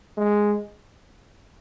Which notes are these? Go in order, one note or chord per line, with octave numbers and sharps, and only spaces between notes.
G#3